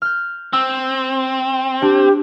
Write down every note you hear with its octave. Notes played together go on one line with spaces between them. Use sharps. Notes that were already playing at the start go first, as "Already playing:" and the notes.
F6 G6
C4 E6
D4 G4